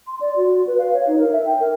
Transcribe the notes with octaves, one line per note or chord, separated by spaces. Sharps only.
C6
D5
F#4
B4
F5
C#5
D#4
A#4
E5
G5
A#4